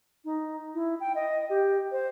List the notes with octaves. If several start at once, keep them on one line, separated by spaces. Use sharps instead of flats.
D#4
E4
G5
D#5
G4
C5